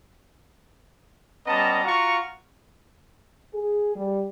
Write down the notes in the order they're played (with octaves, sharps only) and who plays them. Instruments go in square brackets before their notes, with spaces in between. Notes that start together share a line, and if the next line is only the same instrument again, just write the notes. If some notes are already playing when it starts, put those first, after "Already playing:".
[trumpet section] G3 B3 C#4 D#5 A5 A#5
F4 F#4 F5 A#5 C#6
[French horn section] G#4
G3